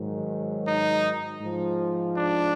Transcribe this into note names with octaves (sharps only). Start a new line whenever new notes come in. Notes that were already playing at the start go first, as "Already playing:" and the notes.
Already playing: G#2 D#3 F#3
D#4
G#2 F3
D4